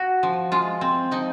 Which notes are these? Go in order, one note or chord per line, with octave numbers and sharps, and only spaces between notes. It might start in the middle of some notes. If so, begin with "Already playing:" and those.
Already playing: F#4
F3
G#3 F4
C4
F3 D#4